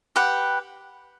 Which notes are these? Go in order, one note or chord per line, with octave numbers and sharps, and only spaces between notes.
G4 B4 F#5